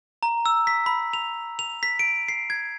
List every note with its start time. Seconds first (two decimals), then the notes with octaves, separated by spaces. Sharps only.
0.23 A#5
0.46 E6
0.67 B6
0.86 B5
1.13 F7
1.59 F7
1.83 B6
1.99 D7
2.28 C7
2.50 G#6